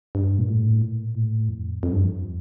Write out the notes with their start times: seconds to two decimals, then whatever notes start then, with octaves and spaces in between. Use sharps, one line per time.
0.15 G2
0.38 A#2
0.49 A2
0.82 A#2
1.15 A2
1.49 F2
1.83 F2
1.92 G2
2.03 F2